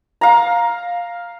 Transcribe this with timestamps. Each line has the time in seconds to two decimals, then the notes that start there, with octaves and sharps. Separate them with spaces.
0.21 F5 A#5